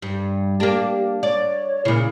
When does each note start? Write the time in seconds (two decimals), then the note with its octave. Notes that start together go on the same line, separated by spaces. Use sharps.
0.02 G2
0.60 A#3 D4 G4
1.23 C#5 D5
1.85 A#2 C#3 E4